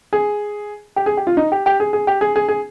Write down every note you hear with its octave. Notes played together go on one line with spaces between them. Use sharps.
G#4
G4
G#4
G4
F4
D#4
G4
G4
G#4
G#4
G4
G#4
G#4
G#4